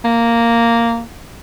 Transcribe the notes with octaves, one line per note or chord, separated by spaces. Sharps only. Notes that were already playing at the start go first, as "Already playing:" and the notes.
A#3